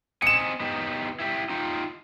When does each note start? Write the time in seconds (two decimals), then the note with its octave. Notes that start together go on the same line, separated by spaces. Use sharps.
0.22 C4 D#5 G#5 C#7 E7
0.60 B3 D#4 G4
1.20 E4 G4
1.49 D#4 F4 G5